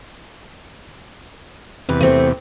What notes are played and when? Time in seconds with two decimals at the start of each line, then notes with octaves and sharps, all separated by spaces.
1.89 E2 C3 B4
2.01 A3 C4